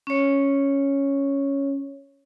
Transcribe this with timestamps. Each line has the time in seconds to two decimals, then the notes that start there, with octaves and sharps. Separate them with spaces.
0.07 C#4 C#5